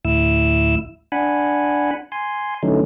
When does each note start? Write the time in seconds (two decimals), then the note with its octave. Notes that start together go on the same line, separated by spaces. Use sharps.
0.05 D2 A2 E4 E6
1.12 D4 F#5 G#5 B5
2.12 G#5 C6
2.63 D3 E3 F#3 A3 C#4 D#4